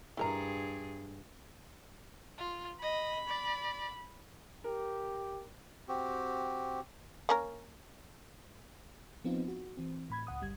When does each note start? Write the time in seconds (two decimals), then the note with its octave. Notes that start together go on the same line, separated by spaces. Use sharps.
0.17 G2 E4 G#4 A#4 A#5
2.38 F4
2.82 D#5 B5
3.28 D5
4.64 G4 A#4
5.88 C4 F#4 G4
7.29 A#3 C#4 A#4
9.24 F3 B3 C4 D#4 F4
9.48 F#4
9.77 E3 C4
10.10 A2 B5 G#6
10.27 C#2 F#5 D#6
10.42 G1 G3 G#6